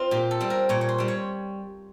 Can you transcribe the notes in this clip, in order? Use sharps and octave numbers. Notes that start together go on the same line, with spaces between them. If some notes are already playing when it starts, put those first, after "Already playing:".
Already playing: C4 F4
A#2 G4
A4
G3 C4
A#4
A#2 C#5
C#5
C5
G3 C4
C#5